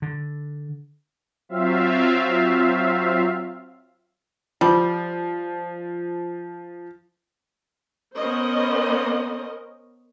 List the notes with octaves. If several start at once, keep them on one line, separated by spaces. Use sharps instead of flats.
D3
F#3 C4 F4 E5 F5
F3 G3
B3 C#4 A#4 C5 D#5